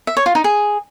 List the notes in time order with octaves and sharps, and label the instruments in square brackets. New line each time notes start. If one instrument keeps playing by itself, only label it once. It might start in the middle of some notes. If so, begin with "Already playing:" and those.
[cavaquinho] E5
C#5
F4
D#4
G#4